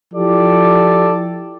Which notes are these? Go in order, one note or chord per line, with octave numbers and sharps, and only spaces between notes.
F3 E4 G4 A4 D5